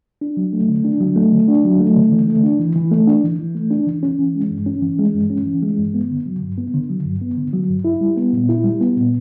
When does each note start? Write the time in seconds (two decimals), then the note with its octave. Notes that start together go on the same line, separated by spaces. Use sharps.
0.21 D4
0.37 F#3
0.53 A3
0.69 D3
0.84 D4
1.01 F#3
1.16 A3
1.33 D3
1.48 D4
1.64 F#3
1.80 A3
1.96 D3
2.12 E3
2.28 A3
2.43 D4
2.60 E3
2.76 E3
2.91 A3
3.07 D4
3.24 E3
3.39 E3
3.55 A3
3.71 D4
3.87 E3
4.03 C#4
4.19 E3
4.35 G#3
4.51 G2
4.66 C#4
4.82 E3
4.99 G#3
5.14 G2
5.30 C#4
5.46 E3
5.62 G#3
5.78 G2
5.94 B3
6.10 D3
6.26 F#3
6.41 G2
6.58 B3
6.74 D3
6.90 F#3
7.05 G2
7.22 B3
7.37 D3
7.53 F#3
7.69 G2
7.85 E4
8.01 G3
8.17 B3
8.33 A#2
8.49 E4
8.64 G3
8.81 B3
8.96 A#2